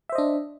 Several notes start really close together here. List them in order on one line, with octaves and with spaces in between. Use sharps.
E5 C5 D#5 D4